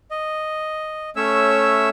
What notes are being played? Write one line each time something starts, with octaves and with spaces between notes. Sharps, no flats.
D#5
A3 C#4 C#5 E5 E6